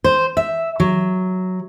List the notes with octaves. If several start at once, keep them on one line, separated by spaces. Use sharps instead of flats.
C5
E5
F#3